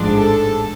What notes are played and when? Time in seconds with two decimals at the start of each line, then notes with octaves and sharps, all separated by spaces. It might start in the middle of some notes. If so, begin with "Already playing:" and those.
Already playing: A1 G#2 F3 G#3 D4
0.15 A4